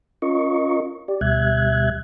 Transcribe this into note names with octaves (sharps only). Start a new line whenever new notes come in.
C#4 F4 A#4 D#5 C#6
G4 D5
D2 B2 G3 E5 F#6 G#6